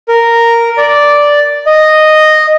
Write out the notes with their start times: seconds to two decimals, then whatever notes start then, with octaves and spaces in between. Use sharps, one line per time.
0.08 A#4
0.78 D5
1.66 D#5